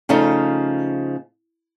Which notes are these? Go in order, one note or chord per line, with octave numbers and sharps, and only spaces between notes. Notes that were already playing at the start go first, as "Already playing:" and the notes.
C#3 F3 A3 D#4